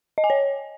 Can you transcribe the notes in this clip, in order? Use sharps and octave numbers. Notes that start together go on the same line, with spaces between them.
D#5
G#5
C#5